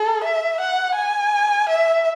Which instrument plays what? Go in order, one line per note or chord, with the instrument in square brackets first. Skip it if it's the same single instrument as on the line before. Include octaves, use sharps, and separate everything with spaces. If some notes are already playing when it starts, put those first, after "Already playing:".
Already playing: [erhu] A4
E5
F#5
G#5
E5